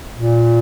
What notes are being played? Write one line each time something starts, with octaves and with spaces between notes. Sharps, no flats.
A#2